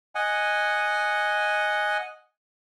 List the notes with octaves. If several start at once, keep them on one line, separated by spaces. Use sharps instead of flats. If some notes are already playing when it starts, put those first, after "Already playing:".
D#5 F#5 G#5